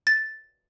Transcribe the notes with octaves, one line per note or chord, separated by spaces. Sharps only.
A6